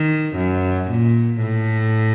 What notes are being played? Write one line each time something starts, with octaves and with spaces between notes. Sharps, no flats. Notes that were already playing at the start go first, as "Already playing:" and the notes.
Already playing: D#3
F#2
A#2
A2